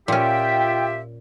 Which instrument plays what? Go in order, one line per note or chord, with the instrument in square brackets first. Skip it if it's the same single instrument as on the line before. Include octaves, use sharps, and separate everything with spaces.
[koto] A#2 C#4 [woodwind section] F4 G4 E5 [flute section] G5